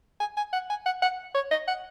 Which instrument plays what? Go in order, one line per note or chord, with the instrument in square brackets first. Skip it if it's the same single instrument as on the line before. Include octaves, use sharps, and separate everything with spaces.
[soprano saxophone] G#5
G#5
F#5
G#5
F#5
F#5
C#5
D#5
F#5